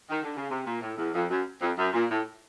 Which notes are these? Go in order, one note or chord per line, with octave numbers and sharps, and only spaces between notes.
D#3
D3
C#3
C3
A#2
A2
E2
F2
F#2
F2
F#2
A#2
A2